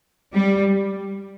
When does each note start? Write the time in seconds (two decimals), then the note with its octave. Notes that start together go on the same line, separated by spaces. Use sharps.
0.33 G3